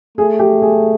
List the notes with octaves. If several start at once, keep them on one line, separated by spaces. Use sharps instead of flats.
A3 G#4
G4
G#4